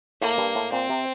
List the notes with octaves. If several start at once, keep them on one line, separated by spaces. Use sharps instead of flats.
A2 A#3
G2
A2
A#2 C4
C3